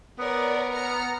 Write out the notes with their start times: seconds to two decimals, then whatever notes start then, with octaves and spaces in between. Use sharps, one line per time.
0.19 B3 A#4 C#5 D5
0.72 A#5 F6 C#7